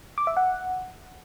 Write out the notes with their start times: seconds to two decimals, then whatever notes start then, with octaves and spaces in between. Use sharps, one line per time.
0.18 D6
0.27 E5
0.37 F#5